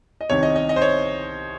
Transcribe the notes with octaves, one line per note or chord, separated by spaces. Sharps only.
D#5
C2 C3 D#3 C#5
D#5
D#5
D#5
C5
C#5